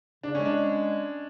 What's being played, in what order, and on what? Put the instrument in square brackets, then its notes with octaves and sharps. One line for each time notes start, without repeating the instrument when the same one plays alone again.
[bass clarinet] C#3 [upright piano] D4
[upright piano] C#4
[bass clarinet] G#3
[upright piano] D4